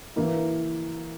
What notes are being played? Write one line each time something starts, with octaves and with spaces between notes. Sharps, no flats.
E3 A#3 E4